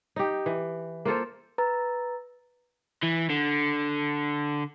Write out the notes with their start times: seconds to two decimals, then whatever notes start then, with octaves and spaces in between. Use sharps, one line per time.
0.16 D#4 G4
0.46 E3
1.05 A#3 F4 A4 C5
1.58 B4 A#5 E6 A6
3.03 E3
3.30 D3